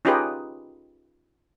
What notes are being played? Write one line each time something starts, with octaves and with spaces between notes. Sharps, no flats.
C#4 D#4 F4 G4 G#4 B4